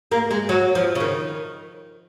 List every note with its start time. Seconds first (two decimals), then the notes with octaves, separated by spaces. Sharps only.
0.12 A#3
0.31 G#3
0.49 F#3
0.75 F3
0.95 C#3
1.00 D#3